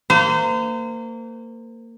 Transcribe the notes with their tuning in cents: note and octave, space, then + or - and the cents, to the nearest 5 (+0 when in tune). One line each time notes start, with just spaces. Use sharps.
A#3 -25 C5 -35